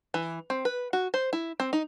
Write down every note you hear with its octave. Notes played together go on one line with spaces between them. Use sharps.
E3
C4
B4
F#4
C5
E4
C4
D#4